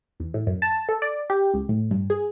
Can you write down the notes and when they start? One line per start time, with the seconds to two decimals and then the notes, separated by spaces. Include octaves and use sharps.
0.20 E2
0.34 A2
0.47 F#2
0.62 A5
0.89 A4
1.02 D5
1.30 G4
1.54 C#2
1.69 A2
1.91 G2
2.10 G#4